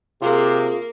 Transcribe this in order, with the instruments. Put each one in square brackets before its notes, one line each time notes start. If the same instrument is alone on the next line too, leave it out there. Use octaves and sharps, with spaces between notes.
[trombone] C3 [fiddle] A#3 [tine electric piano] F4 [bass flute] G#4